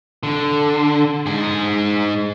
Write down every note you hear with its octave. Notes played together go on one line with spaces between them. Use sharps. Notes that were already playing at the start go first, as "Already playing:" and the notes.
D3
G#2 G#4